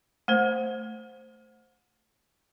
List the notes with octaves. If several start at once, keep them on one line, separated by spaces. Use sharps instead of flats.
A3 C5